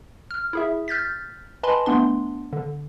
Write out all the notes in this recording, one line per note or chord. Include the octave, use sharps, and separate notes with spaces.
F6
E4 G#4 E5
F6 G6 A6 B6
B4 D#5 G#5 A5 B5 C6
A3 B3 D4 C6
D3